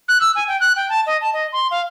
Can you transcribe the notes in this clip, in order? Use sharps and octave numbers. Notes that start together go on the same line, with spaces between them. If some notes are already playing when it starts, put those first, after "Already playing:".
F#6
E6
G#5
G5
F#6
G5
A5
D#5
A5
D#5
C6
F5